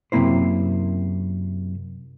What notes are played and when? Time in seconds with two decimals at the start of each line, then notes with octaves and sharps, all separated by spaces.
0.12 F#2 C3 A3 A#3 E4 C5